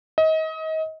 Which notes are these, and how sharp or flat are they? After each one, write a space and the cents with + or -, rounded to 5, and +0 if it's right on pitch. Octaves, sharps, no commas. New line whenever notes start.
D#5 +30